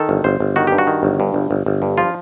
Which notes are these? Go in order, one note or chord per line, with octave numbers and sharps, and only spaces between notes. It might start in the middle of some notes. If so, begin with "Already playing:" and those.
Already playing: D#3 A4
G1
G1 C5
G1
D#3 F#4
G2 G4
F#4
D#3
G1
G2
G1
G1
G1
G2
F3 F4